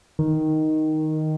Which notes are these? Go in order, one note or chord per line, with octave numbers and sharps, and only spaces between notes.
D#3